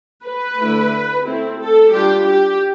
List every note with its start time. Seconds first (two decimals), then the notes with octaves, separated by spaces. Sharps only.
0.25 B4
0.58 D3 A3 E4
1.26 A3 C4 E4
1.59 A4
1.93 G3 D4 F4 G4
2.26 G4